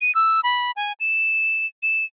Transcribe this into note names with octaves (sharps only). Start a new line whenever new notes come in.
D#7
E6
B5
G#5
E7
E7